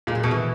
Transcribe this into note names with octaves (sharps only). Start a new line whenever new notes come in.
A#2 G#3
F#3
B2 D#3
E3